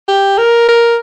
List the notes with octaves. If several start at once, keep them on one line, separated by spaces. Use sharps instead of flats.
G4
A#4
A#4